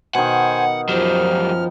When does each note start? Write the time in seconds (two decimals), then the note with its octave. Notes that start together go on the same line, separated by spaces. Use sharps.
0.15 B2 D#3 C5 F#5 G#5
0.89 F#2 F3 F#3 G4 F6